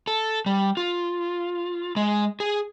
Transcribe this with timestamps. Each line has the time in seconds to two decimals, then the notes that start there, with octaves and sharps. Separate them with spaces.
0.07 A4
0.46 G3
0.77 F4
1.96 G#3
2.40 G#4